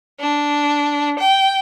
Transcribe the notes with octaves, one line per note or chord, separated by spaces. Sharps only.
D4
G5